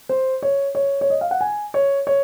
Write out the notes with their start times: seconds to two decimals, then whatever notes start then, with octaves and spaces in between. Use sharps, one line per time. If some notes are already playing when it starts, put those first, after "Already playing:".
0.09 C5
0.42 C#5
0.75 C#5
1.01 C#5
1.10 D#5
1.21 F5
1.31 F#5
1.41 G#5
1.74 C#5
2.07 C#5